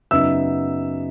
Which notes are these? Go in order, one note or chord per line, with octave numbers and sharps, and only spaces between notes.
F#2 C#3 F#3 B3 D#4 E5 E6